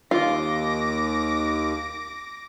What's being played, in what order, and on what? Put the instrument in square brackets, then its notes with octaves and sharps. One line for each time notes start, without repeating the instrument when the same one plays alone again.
[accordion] D#2 [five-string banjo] F4 [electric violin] D6 A#6